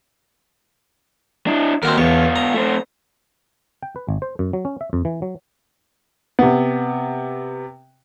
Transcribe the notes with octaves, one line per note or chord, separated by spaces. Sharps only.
D4 E4
D#2 C4 F#4 A#4
E2 B3 F4 C#5
A#5
A3 C4
G5
B4
G#1
C5
F#2
F#3
C#4
E5
F2
E3
F#3
C3 B3